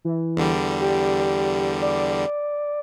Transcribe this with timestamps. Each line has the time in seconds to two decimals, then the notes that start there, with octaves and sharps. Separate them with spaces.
0.05 E3
0.37 E2 D3 G3
0.81 G4
1.82 D5